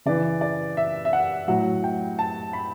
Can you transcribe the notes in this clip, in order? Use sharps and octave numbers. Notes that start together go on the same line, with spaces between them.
C#3 E3 D5
D5
E5
E5
F#5
A2 F#3 F#5
G5
A5
B5